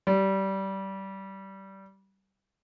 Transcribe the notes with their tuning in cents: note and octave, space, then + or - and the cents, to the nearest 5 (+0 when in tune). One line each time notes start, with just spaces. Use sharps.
G3 -20